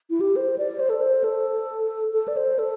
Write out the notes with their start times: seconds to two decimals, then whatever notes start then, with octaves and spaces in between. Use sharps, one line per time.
0.10 E4
0.20 G4
0.36 C5
0.58 D5
0.79 C5
0.90 A4
1.01 C5
1.24 A4
2.13 A4
2.28 D5
2.37 C5
2.59 A4